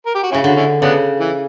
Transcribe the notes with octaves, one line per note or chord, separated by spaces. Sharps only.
A#4
G4
F#4
C#4 E4
C#3
D3 F#4
C#4 E4
C#3 B3 D4
E3